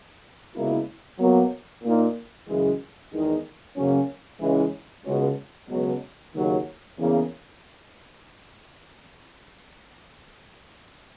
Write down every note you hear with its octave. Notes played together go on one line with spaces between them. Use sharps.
C#2 B2 A#3 E4
B2 F#3 A#3
A#2 A#3 D#4
F#2 C#3 E3 G#3
E2 D#3 G#3 D#4
F#2 C#3 F#3 A#3 C#4
C#2 C#3 E3 G#3
C#2 B2 G#3 C#4
C#2 B2 F#3
D#2 C#3 F#3
E2 C#3 E3 A#3